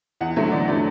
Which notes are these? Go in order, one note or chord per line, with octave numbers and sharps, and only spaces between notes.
E2 F#5
D3 F#3 A3 E5
E2 D5
D3 F#3 A3 D5